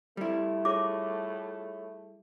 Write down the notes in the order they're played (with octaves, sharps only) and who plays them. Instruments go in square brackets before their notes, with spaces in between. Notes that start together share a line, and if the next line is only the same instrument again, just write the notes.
[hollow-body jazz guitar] G3 E4 [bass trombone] A3
[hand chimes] F4 G#4 C#5 [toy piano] D6